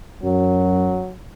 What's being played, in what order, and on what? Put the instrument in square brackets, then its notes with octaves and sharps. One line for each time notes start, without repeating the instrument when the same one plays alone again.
[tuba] F#2 [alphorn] F#3